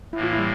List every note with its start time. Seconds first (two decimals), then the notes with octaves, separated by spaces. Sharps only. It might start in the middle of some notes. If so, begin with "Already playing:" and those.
0.13 A2 E3 A#3 E4
0.23 F4
0.33 E4
0.39 G3